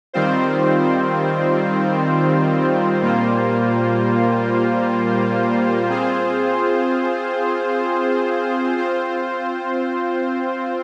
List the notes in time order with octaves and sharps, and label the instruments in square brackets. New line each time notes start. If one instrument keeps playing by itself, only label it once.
[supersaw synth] D#3 G3 C4 F4 C5
A#2 G3 A#3 F4 C5
C4 F4 G#4 C5
C4 F4 C5